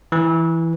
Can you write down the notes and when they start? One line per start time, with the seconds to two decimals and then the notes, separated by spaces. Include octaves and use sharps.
0.12 E3